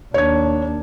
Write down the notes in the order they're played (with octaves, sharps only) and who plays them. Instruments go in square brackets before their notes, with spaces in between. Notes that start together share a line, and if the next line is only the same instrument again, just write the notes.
[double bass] D#2 D4 [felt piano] C#5 G#6